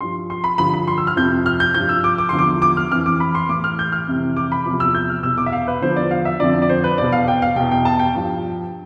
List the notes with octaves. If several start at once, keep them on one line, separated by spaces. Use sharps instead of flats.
G2 F3 C6
C6
B5
G2 D3 F3 B5
B5
C6
E6
F6
F2 C3 F3 G6
F6
G6
G2 F3 G6
E6
D6
D6
E2 D3 F3 C6
D6
D6
F6
F2 E3 F6
D6
B5
C6
A2 E3 D6
F6
G6
F6
F2 C3 E3
D6
B5
E2 C3 F3 D6
E6
G6
F6
E2 B2 E6
D6
E5
F5
B4
E2 D3 F3 C5
D5
F5
E5
F2 D3 F3 D5
D5
C5
B4
E2 B2 D5
F5
G5
F5
E2 B2 G5
G5
A5
G5
G2 F3